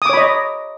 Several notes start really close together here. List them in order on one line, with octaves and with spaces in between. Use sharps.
D#6 D6 C#5 B5 D#5